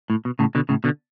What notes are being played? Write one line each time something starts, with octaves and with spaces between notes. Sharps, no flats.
A2
B2
A2 C#3
B2 D3
A2 C#3
B2 D3